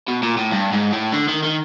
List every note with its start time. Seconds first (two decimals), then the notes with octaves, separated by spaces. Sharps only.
0.08 B2
0.23 A#2
0.37 A2
0.53 G2
0.73 G#2
0.93 A2
1.12 D3
1.28 D#3
1.43 D#3